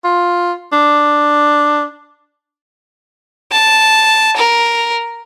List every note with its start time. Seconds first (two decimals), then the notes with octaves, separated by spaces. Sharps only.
0.04 F4
0.73 D4
3.52 A5
4.36 A#4